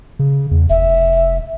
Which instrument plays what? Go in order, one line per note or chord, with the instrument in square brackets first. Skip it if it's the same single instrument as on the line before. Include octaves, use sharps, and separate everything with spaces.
[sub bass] C#3
E2
[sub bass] F1 [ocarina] E5